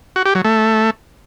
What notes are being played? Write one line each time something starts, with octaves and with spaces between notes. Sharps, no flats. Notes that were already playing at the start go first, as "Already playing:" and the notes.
F#4
G4
F#3
A3